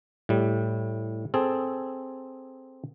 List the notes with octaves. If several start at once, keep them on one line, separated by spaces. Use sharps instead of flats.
A2 G3
C4 G#4 A4